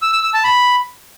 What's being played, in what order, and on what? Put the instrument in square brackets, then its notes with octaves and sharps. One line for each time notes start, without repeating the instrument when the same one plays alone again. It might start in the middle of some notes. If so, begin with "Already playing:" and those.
[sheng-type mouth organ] E6
E6
E6
A5
B5